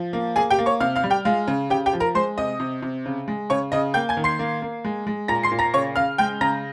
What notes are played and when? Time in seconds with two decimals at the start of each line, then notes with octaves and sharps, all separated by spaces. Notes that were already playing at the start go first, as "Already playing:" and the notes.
Already playing: F3
0.13 A#3
0.36 A#3 G#4 G#5
0.50 G4 G5
0.59 A#3
0.66 C#5 C#6
0.80 C3 F5 F6
0.96 F5 F6
1.04 G3
1.10 G4 G5
1.25 G#3 F4 F5
1.48 C#3
1.70 C#3 G4 G5
1.86 G4 G5
1.93 F3
2.00 A#4 A#5
2.15 G#3 C5 C6
2.38 C3 D#5 D#6
2.60 C3
2.82 C3
3.06 C#3
3.28 G#3
3.50 C#3 C#5 C#6
3.72 C#3 D#5 D#6
3.94 A#3 G5 G6
4.09 G#5 G#6
4.17 D#3
4.24 C6 C7
4.39 A#3
4.62 A#3
4.85 G#3
5.07 G#3
5.28 A#2 A#5 A#6
5.43 C6 C7
5.52 A#2
5.59 A#5 A#6
5.74 C#3 C#5 C#6
5.96 C#3 F5 F6
6.18 G#3 G5 G6
6.41 C#3 A#5 A#6